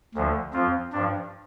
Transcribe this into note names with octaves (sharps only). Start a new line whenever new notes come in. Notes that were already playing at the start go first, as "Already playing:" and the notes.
D2 D3 F3
F2 F3 C4 F4
G2 F3 D4